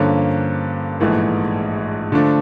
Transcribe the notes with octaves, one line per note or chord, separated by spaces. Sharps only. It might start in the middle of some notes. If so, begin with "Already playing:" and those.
Already playing: G2 D3 F3 A#3 C#4
A#1 G#2 E3 A3
D3 F3 A3 D4